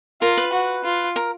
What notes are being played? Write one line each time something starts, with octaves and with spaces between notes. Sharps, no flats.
F4 A#4
B4
F#4
F4
A#4